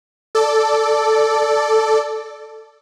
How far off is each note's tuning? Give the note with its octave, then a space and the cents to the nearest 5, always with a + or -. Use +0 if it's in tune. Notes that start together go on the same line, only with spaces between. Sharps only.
A4 +0 D5 +0